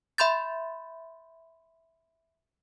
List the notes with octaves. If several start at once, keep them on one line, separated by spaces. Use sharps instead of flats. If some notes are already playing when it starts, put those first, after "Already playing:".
E5 B5 C6 G6 A6